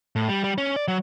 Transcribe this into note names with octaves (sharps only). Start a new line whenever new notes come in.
A2
G3
G3
C#4
D5
F#3